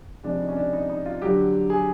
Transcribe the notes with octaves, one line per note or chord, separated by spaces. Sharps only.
C3 F3 G#3 D4
D#4
C#4
D4
D#4
D#4
F4
D3 F#3 G4
G#4